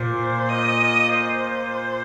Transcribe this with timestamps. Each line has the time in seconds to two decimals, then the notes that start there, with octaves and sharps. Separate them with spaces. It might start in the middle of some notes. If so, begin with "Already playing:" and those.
Already playing: A#2 C5
0.48 D#5
1.13 C5